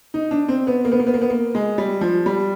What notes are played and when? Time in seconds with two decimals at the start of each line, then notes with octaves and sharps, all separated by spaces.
0.14 D#4
0.31 D4
0.48 C4
0.67 B3
0.85 A#3
0.92 B3
0.99 A#3
1.07 B3
1.14 A#3
1.22 B3
1.30 A#3
1.55 G#3
1.78 G3
2.01 F3
2.26 G3